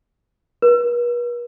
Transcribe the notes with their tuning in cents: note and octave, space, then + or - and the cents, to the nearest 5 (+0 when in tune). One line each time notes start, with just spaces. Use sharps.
B4 -45